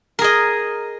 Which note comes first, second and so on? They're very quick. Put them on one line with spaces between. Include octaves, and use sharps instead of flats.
A#4 G#4 D#5